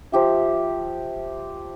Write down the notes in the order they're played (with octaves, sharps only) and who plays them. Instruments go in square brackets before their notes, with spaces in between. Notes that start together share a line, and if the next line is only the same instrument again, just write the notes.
[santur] F3 G4 E5